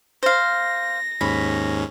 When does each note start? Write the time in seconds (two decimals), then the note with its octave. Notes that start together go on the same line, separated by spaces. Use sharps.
0.23 C5 F5 A#6
1.21 D#2 G#2 C#4 B5